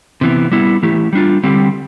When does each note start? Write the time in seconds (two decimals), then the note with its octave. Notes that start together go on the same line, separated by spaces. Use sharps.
0.21 C3 E3 B3
0.51 G3 B3 E4
0.83 E3 A3 E4 G4
1.13 G3 D4 F4
1.44 D3 G3 C4 G4